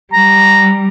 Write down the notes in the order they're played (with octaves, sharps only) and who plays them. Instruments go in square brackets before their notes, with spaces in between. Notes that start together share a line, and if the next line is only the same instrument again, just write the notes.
[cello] G3 [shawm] A#5